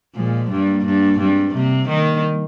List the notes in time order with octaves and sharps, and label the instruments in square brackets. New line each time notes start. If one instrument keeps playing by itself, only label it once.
[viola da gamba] A#2 [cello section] F3 G#3
[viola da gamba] G2 [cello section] G3 A#3
[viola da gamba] G2
[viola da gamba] G2 [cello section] G#3 C4
[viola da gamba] C3 [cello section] G3 A#3
[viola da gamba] D#3 [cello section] G3 A#3